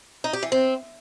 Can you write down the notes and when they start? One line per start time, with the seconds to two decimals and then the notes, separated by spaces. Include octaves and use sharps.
0.24 D#4
0.33 G4
0.43 E3
0.52 C4